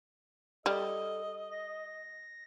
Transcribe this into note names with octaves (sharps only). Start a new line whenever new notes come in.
G3 A4 D#5
A#6